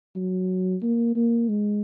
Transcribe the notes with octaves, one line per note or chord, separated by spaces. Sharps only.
F#3
A#3
A#3
G#3